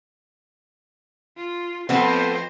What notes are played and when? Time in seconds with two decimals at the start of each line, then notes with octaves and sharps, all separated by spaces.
1.37 F4
1.89 F2 A3 B3 C4 C5